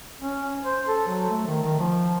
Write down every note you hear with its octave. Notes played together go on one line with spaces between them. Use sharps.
C#4
C5
A4
F#3
A3
D#3
D#3
F3